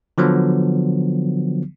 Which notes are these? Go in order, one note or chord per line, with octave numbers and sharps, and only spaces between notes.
D3 F3 F#3 B3